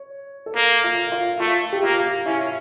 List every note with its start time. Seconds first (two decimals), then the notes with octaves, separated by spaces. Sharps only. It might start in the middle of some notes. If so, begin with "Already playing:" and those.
Already playing: C#5
0.46 A4
0.55 A#3 A#4
0.84 F4
1.12 F4
1.40 A3 F4
1.73 G4
1.83 A#3 F4
2.26 C#4 E4